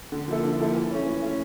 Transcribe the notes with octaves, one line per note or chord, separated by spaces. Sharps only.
D3
F3 A#3 E4 A4
D3
F3 A#3 E4 A4
E3
A3 C#4
E3
A3 C#4